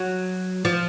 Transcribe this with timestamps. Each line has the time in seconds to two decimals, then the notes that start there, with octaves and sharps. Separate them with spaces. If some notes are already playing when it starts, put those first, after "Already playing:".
Already playing: F#3
0.65 F3